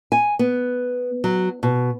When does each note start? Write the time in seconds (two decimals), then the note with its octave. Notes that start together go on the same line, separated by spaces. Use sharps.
0.12 G#5
0.39 B3
1.24 F#3
1.63 B2